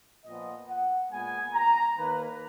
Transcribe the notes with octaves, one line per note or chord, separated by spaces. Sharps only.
A#2 F3 B3 D#5
F#5
A#2 G#3 B3 G#5
A#5
D#2 D#3 A#3 B4